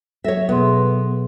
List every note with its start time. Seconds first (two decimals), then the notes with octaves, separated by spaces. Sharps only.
0.24 F#3 A4 C#5 E5 A#6
0.49 B2 B3 G#4 C6